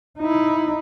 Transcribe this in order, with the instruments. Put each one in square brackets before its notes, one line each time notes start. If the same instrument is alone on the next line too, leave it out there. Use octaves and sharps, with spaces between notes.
[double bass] D#4 E4